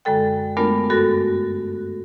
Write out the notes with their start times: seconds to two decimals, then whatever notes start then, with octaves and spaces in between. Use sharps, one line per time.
0.05 F#2 D3 G#3 A4 G5
0.57 G#3 A3 B3 D4 F4 A#4
0.90 G2 F#4 A4 F#6 A#6